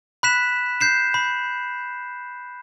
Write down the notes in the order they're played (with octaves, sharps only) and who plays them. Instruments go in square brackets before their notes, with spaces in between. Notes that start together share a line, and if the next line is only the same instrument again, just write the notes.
[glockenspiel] B5 F#6 B6 E7
G6 C7 E7
B5